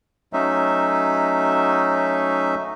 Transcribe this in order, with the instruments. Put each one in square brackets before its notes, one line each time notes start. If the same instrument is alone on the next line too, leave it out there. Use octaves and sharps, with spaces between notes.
[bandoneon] F#3 A3 C#4 D#4 E5